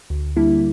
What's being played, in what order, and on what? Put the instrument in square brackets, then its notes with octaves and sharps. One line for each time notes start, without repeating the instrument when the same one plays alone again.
[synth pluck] D2
D3 G3 A#3 E4